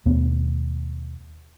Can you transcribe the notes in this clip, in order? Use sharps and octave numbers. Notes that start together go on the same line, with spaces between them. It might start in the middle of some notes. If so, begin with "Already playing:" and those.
D#2 B2 A3 B3